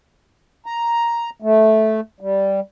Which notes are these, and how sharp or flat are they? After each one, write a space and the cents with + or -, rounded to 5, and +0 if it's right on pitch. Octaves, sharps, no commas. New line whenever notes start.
A#5 +5
A3 -10
G3 -5